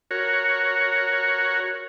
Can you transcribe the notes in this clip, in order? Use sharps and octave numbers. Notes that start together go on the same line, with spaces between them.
F#4 A#4 C#5